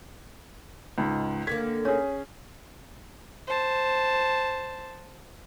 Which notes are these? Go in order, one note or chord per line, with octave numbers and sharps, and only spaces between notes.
C#2 G#2
D#2 D3 A#3 G#6 B6
C#4 G#4 C#5
C5 A5